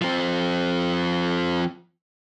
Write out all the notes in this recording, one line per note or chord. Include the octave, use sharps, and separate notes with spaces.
F3 C4